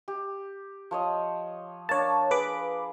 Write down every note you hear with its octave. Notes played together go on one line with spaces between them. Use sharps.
G4
F3 C#5 D#5
A#3 D4 C#5 A5
G#4 B4 B5 D6